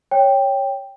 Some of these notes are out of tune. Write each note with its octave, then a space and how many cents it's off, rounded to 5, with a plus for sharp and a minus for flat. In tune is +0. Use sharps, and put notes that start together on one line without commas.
C#5 +0 G5 +5